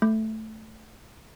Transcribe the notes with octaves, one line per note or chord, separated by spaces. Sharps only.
A3